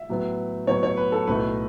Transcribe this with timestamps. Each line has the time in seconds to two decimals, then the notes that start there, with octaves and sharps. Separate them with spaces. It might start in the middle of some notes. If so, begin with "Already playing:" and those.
Already playing: E5
0.09 A2 F#3 B3
0.67 A2 F#3 B3 C#5
0.83 C#5
0.97 B4
1.12 A4
1.27 B1 A2 A3 E4 B4